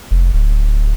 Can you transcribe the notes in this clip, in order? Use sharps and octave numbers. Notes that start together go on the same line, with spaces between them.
F1
D1